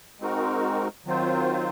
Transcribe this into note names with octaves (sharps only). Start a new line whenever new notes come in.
G#3 C4 D#4 F#4 A#4
D#3 F#3 C4 F4 C5